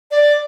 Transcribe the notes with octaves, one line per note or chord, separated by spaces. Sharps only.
D5